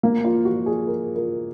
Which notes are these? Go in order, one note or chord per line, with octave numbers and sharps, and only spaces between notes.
A#3
F4
F#4
G#4
A#4
A#4